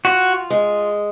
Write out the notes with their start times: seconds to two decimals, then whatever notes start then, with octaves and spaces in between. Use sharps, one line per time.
0.05 F4 F#4
0.50 G#3